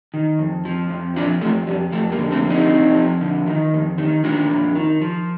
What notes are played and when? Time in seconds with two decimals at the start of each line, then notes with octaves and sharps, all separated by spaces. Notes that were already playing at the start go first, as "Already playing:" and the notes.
0.14 D#3
0.39 F2
0.65 F3
0.90 F2
1.16 F3 D4 F4
1.41 F2 F3 A3
1.67 F2 G3
1.92 F2 F3 A3
2.12 G3 A#3
2.18 D3
2.31 A3 C4
2.45 F3
2.50 C4 D#4
2.70 F2
2.95 F3
3.21 D3
3.47 D#3
3.73 F2
3.98 D#3
4.23 D#3 D4 F4
4.49 F2
4.75 D#3
5.01 F3